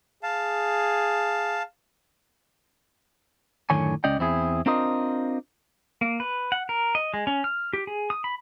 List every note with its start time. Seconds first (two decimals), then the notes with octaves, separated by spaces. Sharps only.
0.23 G#4 F5 A5
3.70 F#2 A2 D3 D#3 C#5 G#5
4.04 C#2 C#4 D5 D#5 G5
4.19 E2 C4 E4 G#4
4.66 C4 D4 F4 A#4 C5 D#5
6.01 A#3
6.20 B4
6.52 F#5
6.69 A#4
6.95 D#5
7.14 G#3
7.27 C#4
7.44 F6
7.73 G4
7.87 G#4
8.10 D#6
8.24 B5